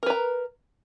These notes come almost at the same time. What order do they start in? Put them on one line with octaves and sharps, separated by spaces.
A#4 B4 A#5